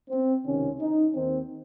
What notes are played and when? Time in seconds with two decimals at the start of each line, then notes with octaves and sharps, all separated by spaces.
0.11 C4
0.45 C#2 C3 D#3 C#4
0.80 D#4
1.15 D#2 D#3 C4